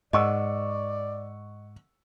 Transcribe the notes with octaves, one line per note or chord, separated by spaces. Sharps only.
G#2 D5 D#5 F#5 C#6 E6